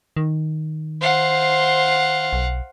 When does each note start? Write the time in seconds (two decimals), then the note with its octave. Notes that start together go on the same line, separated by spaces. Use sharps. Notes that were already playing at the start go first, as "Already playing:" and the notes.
0.17 D#3
1.01 C5 F5 F#5
2.33 B1